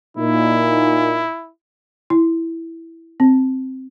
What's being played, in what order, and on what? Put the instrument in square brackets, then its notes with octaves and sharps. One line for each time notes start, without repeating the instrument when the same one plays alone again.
[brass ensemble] A#2 D#4 [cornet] E4
[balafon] E4
C4